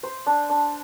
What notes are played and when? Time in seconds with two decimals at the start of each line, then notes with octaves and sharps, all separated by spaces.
0.03 C5
0.26 D4
0.50 D4